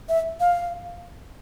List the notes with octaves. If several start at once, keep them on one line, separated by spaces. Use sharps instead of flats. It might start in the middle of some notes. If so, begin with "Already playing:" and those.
E5
F5